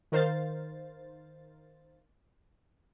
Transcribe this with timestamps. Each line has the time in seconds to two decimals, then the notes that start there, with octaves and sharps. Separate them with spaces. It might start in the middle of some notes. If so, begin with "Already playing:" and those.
0.12 D#3 A#4 C5 F5 A6